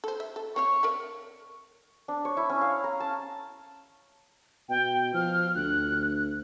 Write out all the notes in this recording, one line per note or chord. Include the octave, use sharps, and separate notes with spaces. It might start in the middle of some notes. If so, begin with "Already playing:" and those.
A4 C5
E5
A4
C4 C#5 F5 C#6
A#4 D5 E5
D4
C#5
E4
C#4
F5
A#5
A5
B2 G5
F3 F6
D2 F#6